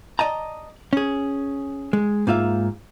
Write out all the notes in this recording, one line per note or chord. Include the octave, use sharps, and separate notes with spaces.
D5 D#5 A5 A#5
C#4 G#4
G#3
G#2 A#3 F4 E5 F5